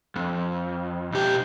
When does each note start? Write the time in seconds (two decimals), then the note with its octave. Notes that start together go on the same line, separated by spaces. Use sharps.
0.16 F2
1.12 B1 G4